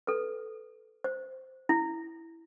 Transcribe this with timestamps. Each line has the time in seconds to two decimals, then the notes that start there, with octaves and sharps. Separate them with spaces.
0.07 A4 B4
1.04 C5
1.69 E4